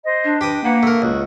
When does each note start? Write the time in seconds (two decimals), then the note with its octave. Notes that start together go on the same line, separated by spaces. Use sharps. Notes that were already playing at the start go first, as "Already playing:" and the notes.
0.05 C5 D#5
0.24 D4
0.41 G4 B4 D6 D#6
0.64 A#3 B4 F#5 A#5
0.83 A3 A#4
1.02 C#2 F#4